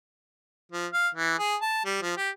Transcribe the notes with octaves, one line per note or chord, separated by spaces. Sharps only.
F3
F5
E3
G#4
A5
G3
F3
G4